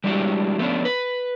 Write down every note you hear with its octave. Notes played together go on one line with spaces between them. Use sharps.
G3 G#3 D4 E4 F#4 G4
F3 A3 B3 C#4 D4
B4